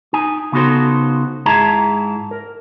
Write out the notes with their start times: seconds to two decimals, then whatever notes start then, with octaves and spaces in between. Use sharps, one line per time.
0.13 D#4 G#5
0.52 C#3 B3 D#4 F#4 A4 C5
1.46 G#2 E4 G#4 A5 A#5
2.31 A#4